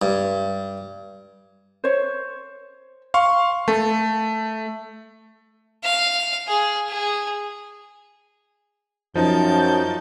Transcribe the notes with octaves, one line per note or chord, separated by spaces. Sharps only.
G2
C5 C#5
F5 C6 C#6
A3 A4
F5
G#4
G#4
F#2 F3 D#4 A5 G6